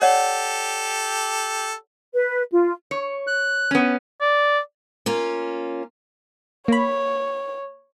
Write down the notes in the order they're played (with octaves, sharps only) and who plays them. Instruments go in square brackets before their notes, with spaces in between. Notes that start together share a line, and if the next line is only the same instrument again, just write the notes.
[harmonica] G4 A4 [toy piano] C#5 D5 F#5
[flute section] B4
F4
[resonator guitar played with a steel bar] C#5
[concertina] F#6
[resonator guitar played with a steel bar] B3 C#4
[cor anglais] D5
[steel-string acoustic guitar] A#3 C#4 F4
[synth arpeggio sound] A#3 B5 [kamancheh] C#5